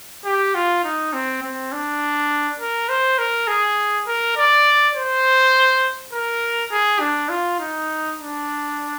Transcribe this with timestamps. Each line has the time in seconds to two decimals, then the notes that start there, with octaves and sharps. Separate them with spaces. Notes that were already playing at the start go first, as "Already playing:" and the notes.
0.25 G4
0.55 F4
0.84 D#4
1.13 C4
1.43 C4
1.72 D4
2.60 A#4
2.89 C5
3.18 A#4
3.48 G#4
4.07 A#4
4.36 D5
4.95 C5
6.13 A#4
6.71 G#4
7.00 D4
7.29 F4
7.60 D#4
8.18 D4